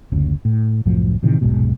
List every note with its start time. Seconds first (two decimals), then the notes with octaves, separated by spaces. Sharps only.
0.12 F#1 D2 C#3
0.45 A2
0.86 C2 F#2 A2 F3
1.23 A2 C3 D#3 E3
1.41 D#1 B1 G#2 B2